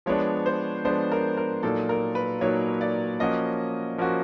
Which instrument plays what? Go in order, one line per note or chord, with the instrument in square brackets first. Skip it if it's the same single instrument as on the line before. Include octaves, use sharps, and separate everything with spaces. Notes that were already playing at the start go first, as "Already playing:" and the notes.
[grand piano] F3 G#3 B3 D4 [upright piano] C#5
[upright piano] C5
[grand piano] F3 G#3 B3 D4 [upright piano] C5
[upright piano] A#4
A#4
[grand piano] A#2 F#3 A#3 D#4 [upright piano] A4
[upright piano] A#4
B4
[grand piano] A#2 F#3 A#3 D#4 [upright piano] C#5
[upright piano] D5
[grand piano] F3 A#3 C#4 F#4 [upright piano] D#5
[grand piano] F3 A#3 C#4 F#4